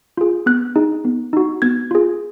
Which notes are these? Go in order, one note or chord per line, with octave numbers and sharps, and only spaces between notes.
F4 G#4
B3 F#6
D#4 G#4
B3
D#4 F#4
B3 G#6
F4 G#4